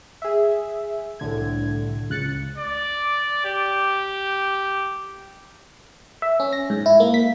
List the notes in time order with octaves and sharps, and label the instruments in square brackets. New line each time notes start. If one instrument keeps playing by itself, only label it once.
[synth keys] G#4 E5
C2 A2 D3 G#6
C#2 F#6 A6 C#7
[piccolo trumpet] D5
G4
[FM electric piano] E5
C#4
A#6
G#2
E4
A#3
B6